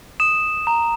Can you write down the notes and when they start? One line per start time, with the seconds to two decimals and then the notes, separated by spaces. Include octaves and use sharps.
0.20 D#6 E7
0.67 A#5